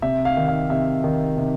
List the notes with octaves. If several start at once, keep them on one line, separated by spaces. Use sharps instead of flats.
C3 E5
F5
D#3
F5
C3 E5
D#3
C3